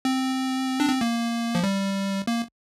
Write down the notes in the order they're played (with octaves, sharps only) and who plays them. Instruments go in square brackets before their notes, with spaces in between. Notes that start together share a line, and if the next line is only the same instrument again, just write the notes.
[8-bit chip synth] C4
D4
C4
A#3
F3
G3
A#3